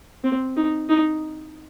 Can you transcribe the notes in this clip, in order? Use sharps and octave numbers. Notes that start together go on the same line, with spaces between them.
C4
D#4
D#4